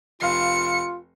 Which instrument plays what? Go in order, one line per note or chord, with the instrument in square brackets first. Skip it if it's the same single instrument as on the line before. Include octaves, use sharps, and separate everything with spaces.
[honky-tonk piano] F1 F5 [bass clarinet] F4 [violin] C#7